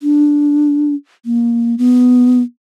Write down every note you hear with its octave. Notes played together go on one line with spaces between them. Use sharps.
D4
A#3
B3